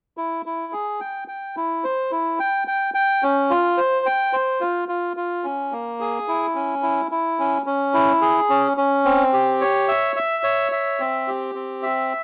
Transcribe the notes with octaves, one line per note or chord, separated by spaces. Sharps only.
E4
E4
G#4
G5
G5
E4
C5
E4
G5
G5
G5
C#4
F4
C5
G5
C5
F4
F4
F4
C#4
A#3
G#4
E4
C#4
E4
E4
C#4
C#4
E4
G#4
C#4
C#4
C4
G4
C#5
E5
E5
C#5
E5
C4
G4
C4
E5